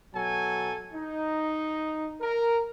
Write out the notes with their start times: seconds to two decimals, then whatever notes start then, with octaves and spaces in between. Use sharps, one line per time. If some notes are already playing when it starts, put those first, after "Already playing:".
0.13 B2 F#3 A4 G#5
0.93 D#4
2.20 A#4